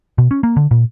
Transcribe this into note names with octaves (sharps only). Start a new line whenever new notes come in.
B2
C#4
A#3
D3
A#2